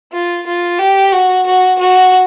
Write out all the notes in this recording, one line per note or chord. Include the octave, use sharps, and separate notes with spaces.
F4
F4
G4
F#4
F#4
F#4